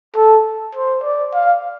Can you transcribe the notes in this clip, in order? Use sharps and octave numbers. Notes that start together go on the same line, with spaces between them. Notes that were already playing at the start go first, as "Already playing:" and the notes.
A4
C5
D5
F5